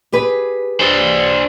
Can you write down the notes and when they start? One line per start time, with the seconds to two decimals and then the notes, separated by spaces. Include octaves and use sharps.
0.12 G4 G#4 B4
0.81 D4 C5